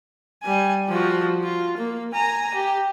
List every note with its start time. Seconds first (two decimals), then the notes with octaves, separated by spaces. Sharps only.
0.43 G3 G#5
0.89 F3 F#4
1.43 F4
1.77 A#3
2.13 G#5 A#5
2.54 G4